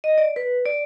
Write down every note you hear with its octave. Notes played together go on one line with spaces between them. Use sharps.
D#5
D5
B4
D5